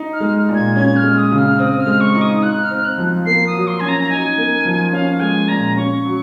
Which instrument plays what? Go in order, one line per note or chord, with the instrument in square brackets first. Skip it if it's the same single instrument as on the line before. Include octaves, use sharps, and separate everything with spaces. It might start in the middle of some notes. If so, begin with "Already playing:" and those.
Already playing: [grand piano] D#4
[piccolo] F6
[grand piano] G#3
A#2
[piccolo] G#6
[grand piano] C#4 [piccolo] G#6
[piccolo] F6
[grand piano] G#3
[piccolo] D#6
[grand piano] C#3
[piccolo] F6
[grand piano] C4 [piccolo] D#6
[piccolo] F6
[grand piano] G#3
[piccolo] C#6
[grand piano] D#4
[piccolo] D#6
[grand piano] D#4 [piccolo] F#6
[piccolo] F6
[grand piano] C4
[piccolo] F#6
[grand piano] F3
[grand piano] A#3 [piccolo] C7
[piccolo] D#6
[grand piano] F#3
[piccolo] C6
[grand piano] C#4 [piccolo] G#5
[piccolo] A#5
A#5
[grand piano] D#4 [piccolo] G#5
[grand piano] A#3
F3
[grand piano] C#4 [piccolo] F5
[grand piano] G#3 [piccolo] G#5
[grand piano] A#2 [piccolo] A#5
[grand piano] C#4 [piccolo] C#6
[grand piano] F#3